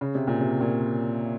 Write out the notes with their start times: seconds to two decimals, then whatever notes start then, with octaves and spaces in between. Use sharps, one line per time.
0.01 C#3
0.15 C3
0.27 A#2
0.41 C3
0.61 A#2